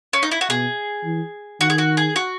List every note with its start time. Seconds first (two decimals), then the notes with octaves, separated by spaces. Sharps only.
0.13 C#4
0.23 D#4
0.31 E4
0.41 F#4
0.50 B2 G#4
1.05 E3
1.61 D#3 F#4
1.70 G#4
1.78 F#4
1.97 G#4
2.16 F#4